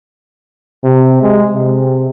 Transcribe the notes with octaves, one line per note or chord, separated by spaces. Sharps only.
C3
G#3
C3